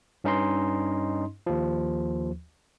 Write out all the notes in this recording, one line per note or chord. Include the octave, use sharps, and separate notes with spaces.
G2 C#4 D#4 D#5 C6
D#2 F3